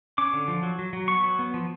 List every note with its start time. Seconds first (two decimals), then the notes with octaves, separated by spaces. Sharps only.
0.18 C#4 D6
0.33 D3
0.48 F3
0.63 F#3
0.79 F#3
0.93 F#3
1.08 B3 C#6
1.24 F#3
1.39 B3
1.54 F3